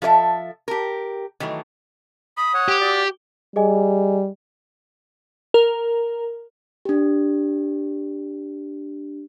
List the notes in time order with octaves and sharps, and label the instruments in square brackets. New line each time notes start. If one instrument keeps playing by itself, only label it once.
[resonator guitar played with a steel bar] F3 A4 C#5 E5
G4 A#4
D#3 E3 F#3 A3
[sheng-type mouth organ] B5 [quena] D#6
[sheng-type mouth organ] C#5 F#5
[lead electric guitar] G4
[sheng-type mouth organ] F#4 D5
[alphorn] G3 [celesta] G#4 D#5 G#5
[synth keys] A#4
[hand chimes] D4 G4